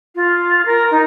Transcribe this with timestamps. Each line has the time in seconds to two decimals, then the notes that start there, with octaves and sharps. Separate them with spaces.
0.15 F4
0.65 A#4
0.90 D#4